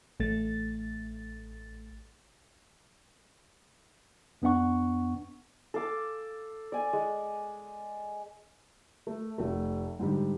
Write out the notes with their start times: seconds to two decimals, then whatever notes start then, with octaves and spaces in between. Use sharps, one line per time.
0.20 A1 A3 A6
4.42 F2 B3 D4 F#5 C#6
5.74 A4 F5 D6
6.72 D5 G#5
6.93 G#3
9.07 A3
9.38 F1 A3
9.99 G#2 D3 G3